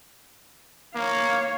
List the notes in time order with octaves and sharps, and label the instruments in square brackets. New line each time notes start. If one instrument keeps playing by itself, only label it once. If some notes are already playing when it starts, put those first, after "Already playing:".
[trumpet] A#3 [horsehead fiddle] C#5 F5